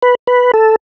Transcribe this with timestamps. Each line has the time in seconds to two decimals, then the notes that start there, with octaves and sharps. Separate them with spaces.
0.02 B4
0.27 B4
0.54 A4